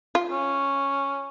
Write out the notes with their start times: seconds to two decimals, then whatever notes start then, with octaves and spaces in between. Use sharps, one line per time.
0.15 F4
0.31 C#4